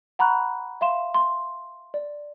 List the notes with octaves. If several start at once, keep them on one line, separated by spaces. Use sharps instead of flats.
F#5 A#5 B5 C#6 F#6
E5 F5 C6 E7
C6
D5